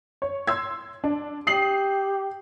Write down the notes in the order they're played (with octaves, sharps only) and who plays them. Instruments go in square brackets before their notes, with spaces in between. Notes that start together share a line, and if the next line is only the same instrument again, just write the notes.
[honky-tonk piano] C#5
C6 E6 G#6
D4
[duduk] G4 [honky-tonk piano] D#6 C7 F#7